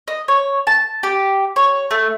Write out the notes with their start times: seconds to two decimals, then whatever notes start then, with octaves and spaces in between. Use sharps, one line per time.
0.08 D#5
0.28 C#5
0.67 A5
1.03 G4
1.56 C#5
1.91 A3